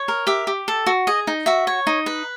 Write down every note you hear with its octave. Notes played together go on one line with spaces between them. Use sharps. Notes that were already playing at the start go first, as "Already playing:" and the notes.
Already playing: C#5
A#4
G4 E5
G4
A4
F#4
G#4 D#5
D#4
F#4 E5
C#5
D#4
B4